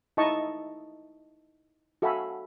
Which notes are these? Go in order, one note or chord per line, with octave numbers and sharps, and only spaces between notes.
D#4 E4 D#5 A5 C#6
F#4 A4 E5 F5 G#5 B5